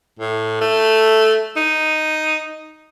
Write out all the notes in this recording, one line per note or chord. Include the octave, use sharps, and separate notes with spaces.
A2
A3
D#4